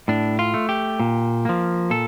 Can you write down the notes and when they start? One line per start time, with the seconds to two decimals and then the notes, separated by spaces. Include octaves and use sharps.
0.08 A2 D4
0.39 F4
0.54 A3
0.69 G4
1.00 A#2
1.45 F3 A#3
1.90 A#2 A4